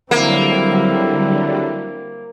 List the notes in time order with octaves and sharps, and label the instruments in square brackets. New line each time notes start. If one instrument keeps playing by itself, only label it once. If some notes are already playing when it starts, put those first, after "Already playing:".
[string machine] D3 F#3 G3 [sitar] A#3 [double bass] C4 E4